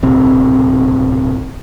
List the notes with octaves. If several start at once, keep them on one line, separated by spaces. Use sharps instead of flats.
D1 B1 C3 C4